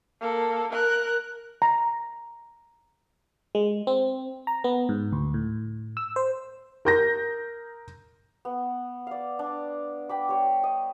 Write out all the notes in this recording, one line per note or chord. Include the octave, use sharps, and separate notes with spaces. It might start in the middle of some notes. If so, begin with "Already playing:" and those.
A#3 A4
A#4 F#6
A#5
G#3
C4
A#5
B3
G#2
D2
A2
E6
C5
A#4 G6 A#6
B3
D5 F5
D4
G5 B5 D6
G3 C#5
D#5